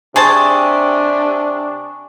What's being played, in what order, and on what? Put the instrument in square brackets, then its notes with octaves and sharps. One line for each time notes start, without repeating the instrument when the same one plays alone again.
[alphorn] C3 [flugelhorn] D4 [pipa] G#4 C5 A5 [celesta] G#5 C#6 D#6